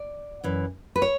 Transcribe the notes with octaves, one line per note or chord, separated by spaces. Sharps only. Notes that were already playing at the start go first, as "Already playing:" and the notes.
Already playing: D5
F#2 E3
B4
C#5